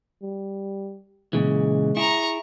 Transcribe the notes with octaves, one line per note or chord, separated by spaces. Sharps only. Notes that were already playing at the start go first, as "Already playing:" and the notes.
G3
A#2 C#3 E3 G#3
E4 G#4 A#5 C#6